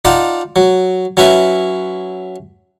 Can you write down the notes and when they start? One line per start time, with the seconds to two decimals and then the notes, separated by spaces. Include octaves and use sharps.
0.05 D#4 F4 D5 F#5 A5 D6
0.56 F#3
1.17 F#3 C#4 E4 B4 E5